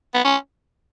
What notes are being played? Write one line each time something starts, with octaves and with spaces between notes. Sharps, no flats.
B3
C#4